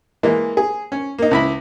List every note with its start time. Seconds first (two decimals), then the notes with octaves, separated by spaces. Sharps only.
0.23 E3 G#3 A#3
0.57 G#4
0.92 C#4
1.19 A#3 D#4
1.31 C#2 E4 B5